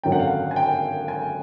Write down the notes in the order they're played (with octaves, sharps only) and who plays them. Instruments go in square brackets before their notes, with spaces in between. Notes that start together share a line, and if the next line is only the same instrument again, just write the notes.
[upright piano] G#1 F#2 D3 F#3 G5
F#5
F5
F#5
G#5
G5
G#5